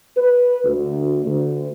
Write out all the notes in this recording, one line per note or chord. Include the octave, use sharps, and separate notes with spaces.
B4
D2
D2